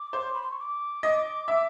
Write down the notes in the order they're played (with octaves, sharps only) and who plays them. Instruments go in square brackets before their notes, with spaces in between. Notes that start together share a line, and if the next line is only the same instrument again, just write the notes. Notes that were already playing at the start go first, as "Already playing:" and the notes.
Already playing: [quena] D6
[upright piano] C5
[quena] B5
C6
C#6
D6
[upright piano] D#5
E5